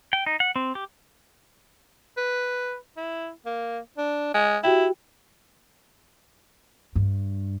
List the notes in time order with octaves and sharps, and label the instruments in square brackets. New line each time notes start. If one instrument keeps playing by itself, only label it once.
[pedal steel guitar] G5
D#4
F#5
C4
G4
[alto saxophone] B4
E4
A#3
D4
G#3
[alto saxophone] E4 [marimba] F#4 G4 G5
[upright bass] G2